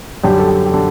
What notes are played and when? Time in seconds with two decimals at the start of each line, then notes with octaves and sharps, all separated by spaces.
0.24 F#2 D3 G3 G4
0.39 A4
0.48 G4
0.66 G4
0.72 D3 A4